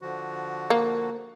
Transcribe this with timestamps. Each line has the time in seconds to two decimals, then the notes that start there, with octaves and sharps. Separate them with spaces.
0.02 D3 F3 F#4
0.70 A#3